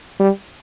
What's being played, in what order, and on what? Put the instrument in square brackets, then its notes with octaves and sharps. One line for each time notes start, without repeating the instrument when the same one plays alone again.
[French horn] G3